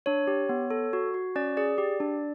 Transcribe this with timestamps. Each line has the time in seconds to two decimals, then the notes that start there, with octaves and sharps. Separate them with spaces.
0.06 D4 C#5
0.27 G4
0.49 B3
0.71 A4
0.93 F#4
1.14 F#4
1.36 C#4 D5
1.57 G#4 D5
1.78 G4
2.00 D4